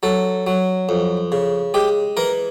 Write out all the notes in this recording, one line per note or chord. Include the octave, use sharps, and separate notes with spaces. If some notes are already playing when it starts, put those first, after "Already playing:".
F#3 A4
F#3
F2
C#3
G#3 G4
E3 A#4